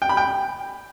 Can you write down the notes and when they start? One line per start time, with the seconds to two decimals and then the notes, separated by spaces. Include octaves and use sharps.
0.02 G5
0.09 B5
0.17 G5